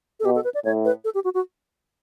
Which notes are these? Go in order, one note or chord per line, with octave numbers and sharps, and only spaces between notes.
A4
B2 G4
A4
B4
D5
A2 C#5
B4
A4
G4
F#4
F#4